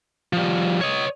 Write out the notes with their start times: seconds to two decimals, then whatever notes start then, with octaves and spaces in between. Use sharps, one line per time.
0.33 F3 G3
0.81 C#5 D#5